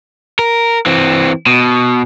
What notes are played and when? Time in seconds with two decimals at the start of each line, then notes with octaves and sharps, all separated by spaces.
0.39 A#4
0.86 E3 C4
1.46 B2